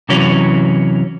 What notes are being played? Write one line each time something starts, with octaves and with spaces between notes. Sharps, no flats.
C3 E3 F#3 C#4